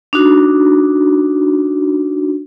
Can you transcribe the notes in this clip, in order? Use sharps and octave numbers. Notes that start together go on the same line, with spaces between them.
D4 D#4 F#4